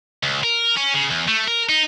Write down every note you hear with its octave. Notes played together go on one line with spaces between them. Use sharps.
C#2
A#4
C#4
C#3
E2
A3
A#4
D#4